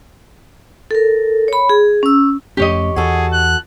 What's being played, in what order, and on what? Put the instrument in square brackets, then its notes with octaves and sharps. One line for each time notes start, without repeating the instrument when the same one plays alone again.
[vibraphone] A4 A#4
C#5 B5
G#4
C#4 E6
[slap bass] F2 A3 C#4 [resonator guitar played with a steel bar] G4 C#5 D#5
[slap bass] E2 [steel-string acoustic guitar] F#4 A4 [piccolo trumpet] G#4
[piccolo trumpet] F#6